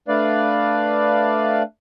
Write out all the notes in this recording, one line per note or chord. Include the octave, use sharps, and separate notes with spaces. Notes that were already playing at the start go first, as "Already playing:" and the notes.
A3 D4 B4 D5 F5